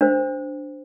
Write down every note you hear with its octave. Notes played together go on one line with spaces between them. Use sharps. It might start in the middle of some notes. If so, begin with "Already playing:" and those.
D4 C5